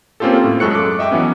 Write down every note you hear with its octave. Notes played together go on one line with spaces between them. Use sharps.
A#3 C4 C#4 F4 G4 A4
A2
F#2 G#3 A4 C#6 F#6 C#7
D6
D#5 E5 G5 D6
E3 F#3 B3 C#4